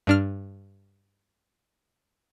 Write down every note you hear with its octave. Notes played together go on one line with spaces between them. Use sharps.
G2 D4 F6